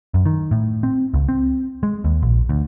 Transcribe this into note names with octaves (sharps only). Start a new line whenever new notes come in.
F#2
D#3
A2
C4
C#2
C4
G#3
D#2
A#1
D2